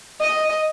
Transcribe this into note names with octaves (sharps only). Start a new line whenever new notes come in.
D#5